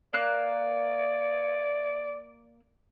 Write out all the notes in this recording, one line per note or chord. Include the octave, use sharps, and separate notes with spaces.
A#3 D5 F5 F#6